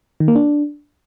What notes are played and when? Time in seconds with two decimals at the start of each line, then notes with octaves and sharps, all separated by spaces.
0.20 D#3
0.28 A#3
0.36 D4